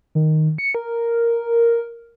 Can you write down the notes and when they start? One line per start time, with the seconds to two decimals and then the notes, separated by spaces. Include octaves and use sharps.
0.15 D#3
0.58 C#7
0.75 A#4